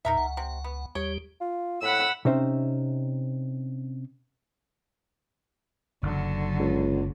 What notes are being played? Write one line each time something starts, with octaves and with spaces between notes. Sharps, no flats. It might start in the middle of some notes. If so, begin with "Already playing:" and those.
E2 A#2 D#4 A#4 E5
C#2 F#5
C3
B3
D#2 G3 G4 C#5
F4
A2 F#5 B5 E6
C3 C#4 D#4 C5 E5
F#1 D3 F#3
C#2